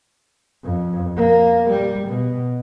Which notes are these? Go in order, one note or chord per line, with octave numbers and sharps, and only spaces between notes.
F2
A#3
G3
B2